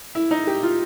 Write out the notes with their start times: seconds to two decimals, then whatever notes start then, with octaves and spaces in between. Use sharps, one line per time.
0.15 E4
0.31 D#4
0.47 G4
0.63 F4